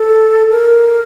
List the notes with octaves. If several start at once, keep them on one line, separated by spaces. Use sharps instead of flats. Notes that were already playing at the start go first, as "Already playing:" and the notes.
Already playing: A4
A#4